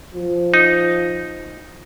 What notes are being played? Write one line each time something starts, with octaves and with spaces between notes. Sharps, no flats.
F3
D#4